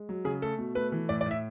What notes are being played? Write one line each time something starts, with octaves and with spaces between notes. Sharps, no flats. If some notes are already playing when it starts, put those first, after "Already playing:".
Already playing: G#3
F#3
C#3 G#4
A3 A4
B2
A3 B4
E3
A2 D5
D5
A2
E5